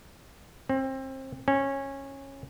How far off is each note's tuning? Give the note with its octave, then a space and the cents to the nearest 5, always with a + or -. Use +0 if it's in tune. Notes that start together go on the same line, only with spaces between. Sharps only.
C4 +25
C#4 -15